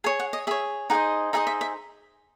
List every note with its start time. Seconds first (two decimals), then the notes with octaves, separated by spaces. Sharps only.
0.04 G#4 C#5 G#5
0.20 F#5
0.33 D#5
0.47 G#4 C#5 E5
0.90 D#4 G#4 C5 D#5 F#5
1.33 D#4 G#4 C5 D#5 E5
1.47 E5
1.61 E5